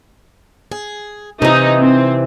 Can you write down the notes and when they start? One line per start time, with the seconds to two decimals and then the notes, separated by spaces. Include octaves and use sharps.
0.72 G#4
1.42 C3 E3 D#4
1.80 C4